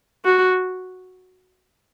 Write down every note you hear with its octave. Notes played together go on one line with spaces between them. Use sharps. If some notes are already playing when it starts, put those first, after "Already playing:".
F#4